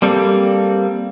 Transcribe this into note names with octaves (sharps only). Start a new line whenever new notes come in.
G3 A#3 C4 A4